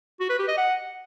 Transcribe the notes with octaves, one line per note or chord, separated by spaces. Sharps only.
F#4
B4
G4
D#5
F#5